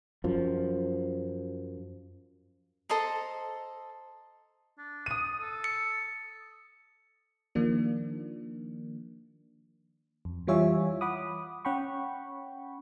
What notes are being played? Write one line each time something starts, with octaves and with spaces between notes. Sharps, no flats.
F#2 F3
A4 C5 D#5 A#5
D4
D#6 D#7
A4
C#7
D#3 F3 A#3 D4
F2
E3 G3 F4 C#5 E5 G#5
F#5 B5 D6 D#6
C#4 F#5 G5 B5 C#6